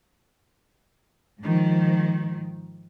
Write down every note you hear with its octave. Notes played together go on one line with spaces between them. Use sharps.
G#2 D#3 F3